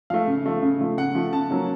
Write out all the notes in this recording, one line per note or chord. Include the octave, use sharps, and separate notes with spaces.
F3 A3 F5
C#3
F3 A3
C#3
F3 A3
C#3 F#5
F3 A3
C#3 A5
F#3 A#3 C#4